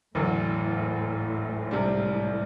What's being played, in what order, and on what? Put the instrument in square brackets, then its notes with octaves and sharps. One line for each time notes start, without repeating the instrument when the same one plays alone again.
[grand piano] F#1 E2 D3 F#3 [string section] A2
[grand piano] C2 C3 G3 D4